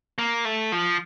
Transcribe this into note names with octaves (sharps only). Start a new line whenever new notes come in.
A#3
A3
F3